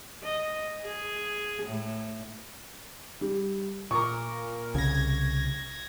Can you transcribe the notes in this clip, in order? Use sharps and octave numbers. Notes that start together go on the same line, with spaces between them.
D#5
G#4
A2
G3
A#2 A#4 C#6 D6
C2 C#3 G#6 A#6